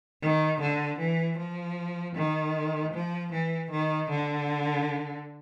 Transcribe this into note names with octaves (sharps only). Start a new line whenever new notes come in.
D#3
D3
E3
F3
D#3
F3
E3
D#3
D3